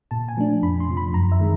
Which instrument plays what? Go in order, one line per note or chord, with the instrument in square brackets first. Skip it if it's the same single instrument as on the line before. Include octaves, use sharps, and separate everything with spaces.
[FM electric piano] A#2 A5
G#5
F3 A3 D4
F2 B5
C6
C3 F3
B5
F#2 A#5
E5
D#3 G#3